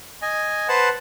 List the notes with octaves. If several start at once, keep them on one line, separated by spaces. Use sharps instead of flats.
D#5 G#5
B4 C5 F#5 A5